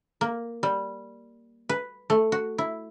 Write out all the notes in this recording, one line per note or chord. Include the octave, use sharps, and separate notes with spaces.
A#3
G3
B4
A3
F#4
E4